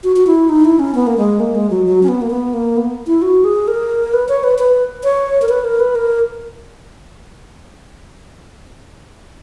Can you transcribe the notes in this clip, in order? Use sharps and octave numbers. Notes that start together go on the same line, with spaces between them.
F#4
F#4
E4
D#4
E4
C#4
B3
A#3
G#3
A#3
G#3
F#3
F#3
C#4
B3
A#3
B3
A#3
B3
E4
F#4
G#4
A#4
B4
C#5
B4
B4
C#5
A#4
B4
A#4
B4
A#4